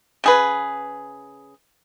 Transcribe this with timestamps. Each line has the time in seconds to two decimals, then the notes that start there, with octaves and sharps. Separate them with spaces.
0.24 C#3 G#4 B4